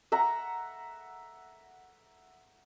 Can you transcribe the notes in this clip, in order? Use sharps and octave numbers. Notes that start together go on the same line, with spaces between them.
E5 F#5 A#5